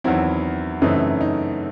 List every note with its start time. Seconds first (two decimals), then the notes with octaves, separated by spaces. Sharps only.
0.04 E2 D#3 F#3 C4 E4
0.82 F#2 C#3 E3 A3 C4 D#4
1.21 D#4